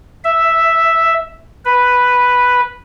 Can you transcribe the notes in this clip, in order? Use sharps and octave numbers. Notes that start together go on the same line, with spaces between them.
E5
B4